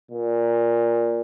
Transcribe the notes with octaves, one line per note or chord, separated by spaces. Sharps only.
A#2